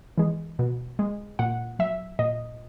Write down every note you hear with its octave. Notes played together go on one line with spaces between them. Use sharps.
E3 G#3
B2
G#3
A#2 F#5
F#3 E5
A#2 D#5